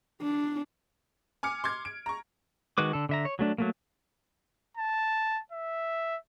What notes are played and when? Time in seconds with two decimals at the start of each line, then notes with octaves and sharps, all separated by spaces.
0.22 D4
1.43 G#5 D6 F6 C#7
1.64 C6 D6 G#6
1.85 D7
2.06 A#5 C#6
2.78 D#3 G#3 F#4 B4 D6
2.93 D3 A4
3.09 D3 E5 A#5
3.25 C#5
3.39 F#3 A3 D4
3.58 F#3 A3 A#3
4.77 A5
5.52 E5